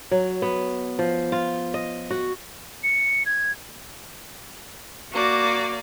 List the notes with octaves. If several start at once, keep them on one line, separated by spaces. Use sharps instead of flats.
F#3
B3
F3
F4
D#5
F#4
C#7
G#6
A#3 F#4 D5